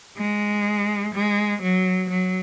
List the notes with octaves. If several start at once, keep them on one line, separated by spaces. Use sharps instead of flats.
G#3
G#3
F#3
F#3